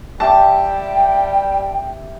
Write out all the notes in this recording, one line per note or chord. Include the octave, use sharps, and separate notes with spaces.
G3 G4 E5 G5 A5